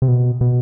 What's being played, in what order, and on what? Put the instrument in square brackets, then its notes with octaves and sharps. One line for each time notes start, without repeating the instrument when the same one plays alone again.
[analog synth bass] C3
B2
B2